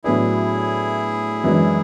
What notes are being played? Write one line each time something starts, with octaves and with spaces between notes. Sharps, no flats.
A2 F#3 B3 D4 E4 G#4
F#2 E3 G#3 D4